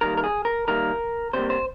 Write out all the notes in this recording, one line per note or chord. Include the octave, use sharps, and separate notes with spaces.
D#3 G3 A#3 A#4
A#4
G#4
A#4
D#3 G3 A#3 A#4
C3 G3 A#3 C5
C5